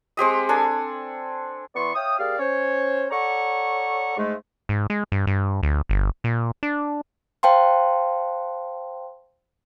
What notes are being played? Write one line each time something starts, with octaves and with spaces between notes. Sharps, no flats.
G#3 C4 G4 D#5
D4 A4 G#5
E3 B3 D5 C6 C#6
C#5 E5 F5 G5 D#6
A#3 G4 G#4 D5 F5
C#4 C5 C#5
A4 C#5 D5 F#5 A#5 C#6
G#2 G#3 A3
G#2
G#3
G2
G2
D2
G1
A#2
D4
C5 F5 G5 A5 C6